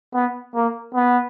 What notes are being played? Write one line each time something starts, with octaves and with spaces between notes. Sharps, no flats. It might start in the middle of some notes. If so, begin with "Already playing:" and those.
B3
A#3
B3